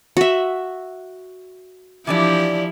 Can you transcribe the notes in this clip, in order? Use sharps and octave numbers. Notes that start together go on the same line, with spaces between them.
F#4 E5
E3 F3 D4 E4 G4 D5